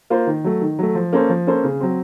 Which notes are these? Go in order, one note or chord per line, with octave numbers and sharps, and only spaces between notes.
A#3 F4 C5
D#3
F#3 A3
D#3
F#3 A3
F3
A#3 C#4 A4 C5
F3
A#3 C#4 A4 C5
C#3
F#3 C4